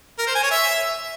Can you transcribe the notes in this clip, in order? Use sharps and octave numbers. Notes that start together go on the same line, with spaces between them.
A#4
C5
G#5
C#5
E5